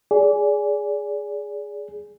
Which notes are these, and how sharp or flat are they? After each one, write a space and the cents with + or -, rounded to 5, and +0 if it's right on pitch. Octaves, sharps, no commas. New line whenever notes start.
G#4 +0 D5 -30